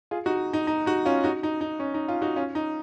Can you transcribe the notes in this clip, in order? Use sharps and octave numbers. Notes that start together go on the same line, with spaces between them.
F4 G#4
D#4 F#4
D#4
D#4
D#4 F#4
C#4 F4
D#4 F#4
D#4
D#4
C#4
D#4
C#4 F4
D#4 F#4
C#4 F4
D#4